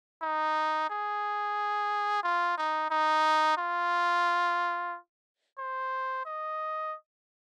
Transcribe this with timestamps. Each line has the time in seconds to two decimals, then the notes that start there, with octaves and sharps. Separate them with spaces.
0.22 D#4
0.90 G#4
2.23 F4
2.57 D#4
2.90 D#4
3.57 F4
5.58 C5
6.25 D#5